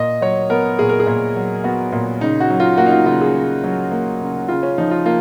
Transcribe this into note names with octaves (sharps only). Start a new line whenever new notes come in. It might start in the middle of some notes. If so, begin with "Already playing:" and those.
Already playing: A#2 D#5
F#3 C#5
B3 A#4
A#2 G#4
A#4
G#4
A#2
F#3
B3 F#4
A#2
C#3 D#4
F#4
F#3
F4
A#3 F#4
D#4
F4
C#3 F4
G#4
C#3
F#3
A#3
C#3
C#3 F4
C#4
F3 D#4
F4
A#3 F4